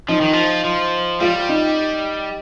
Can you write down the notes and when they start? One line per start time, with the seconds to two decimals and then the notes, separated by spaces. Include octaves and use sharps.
0.09 F3 D#4
0.21 D#3
0.33 F3
0.64 F3
1.20 G3 F4
1.49 D#4